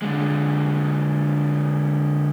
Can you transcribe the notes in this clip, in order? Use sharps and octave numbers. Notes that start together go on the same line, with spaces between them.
D3 G#3